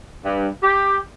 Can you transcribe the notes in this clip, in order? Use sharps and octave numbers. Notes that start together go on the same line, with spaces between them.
G2
G4